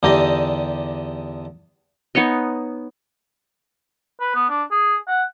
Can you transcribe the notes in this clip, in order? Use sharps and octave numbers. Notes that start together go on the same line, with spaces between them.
E2 D3 D#4 G4 D#5
B3 D#4 C#5 D#5
B4
B3
D4
G#4
F#5